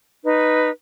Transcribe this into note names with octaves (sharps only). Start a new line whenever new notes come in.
D#4 B4